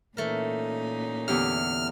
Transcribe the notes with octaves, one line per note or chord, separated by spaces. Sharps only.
A#2 E3 A3 C#4 D#4 A#4
E2 D3 G4 E5 F6